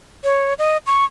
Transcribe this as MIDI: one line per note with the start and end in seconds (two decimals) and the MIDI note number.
0.24 0.54 73
0.59 0.77 75
0.87 1.05 85